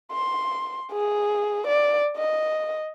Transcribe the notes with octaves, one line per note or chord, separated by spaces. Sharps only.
C6
G#4
D5
D#5